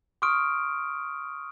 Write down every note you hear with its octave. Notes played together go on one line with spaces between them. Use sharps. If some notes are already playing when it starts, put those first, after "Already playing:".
C6 C#6 D#6 F6 D7